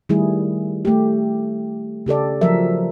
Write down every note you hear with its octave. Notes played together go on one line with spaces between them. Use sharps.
D#3 G3 A3 E4 G#4
A3 G4
C#3 G4 A4 D5
F3 F#3 A#4 E5